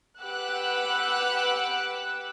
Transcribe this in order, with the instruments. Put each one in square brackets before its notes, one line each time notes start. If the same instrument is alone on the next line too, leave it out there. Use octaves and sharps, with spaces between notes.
[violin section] G4 B4 F#5 D6 E6 F#6